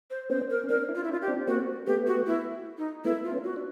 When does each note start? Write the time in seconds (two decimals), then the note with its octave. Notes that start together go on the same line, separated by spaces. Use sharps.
0.10 C5
0.30 B3 C#4 C5
0.50 A#4
0.63 C#4
0.69 C4 D4 A#4
0.88 D4 E4
0.95 F4
1.04 E4
1.09 C#4 D#4
1.12 F4
1.22 G4
1.28 C4 D4
1.47 A#3 C4 F#4
1.87 A3 B3 G4
2.07 F#4
2.26 E4
2.78 D#4
3.04 A3 B3 E4
3.24 F4
3.30 B3 C#4
3.44 F#4
3.56 D4